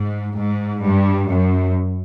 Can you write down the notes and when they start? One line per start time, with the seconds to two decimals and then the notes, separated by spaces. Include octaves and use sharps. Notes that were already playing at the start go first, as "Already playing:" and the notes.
Already playing: G#2
0.37 G#2
0.83 G2
1.30 F#2